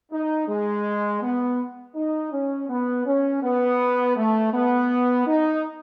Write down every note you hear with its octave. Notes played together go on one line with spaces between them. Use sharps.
D#4
G#3
B3
D#4
C#4
B3
C#4
B3
A3
B3
D#4